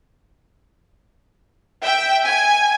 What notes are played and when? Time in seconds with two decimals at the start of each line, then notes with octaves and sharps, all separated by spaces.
1.82 E5 G5
2.23 G#5